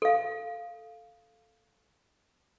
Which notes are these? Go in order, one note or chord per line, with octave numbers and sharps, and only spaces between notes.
A4 F5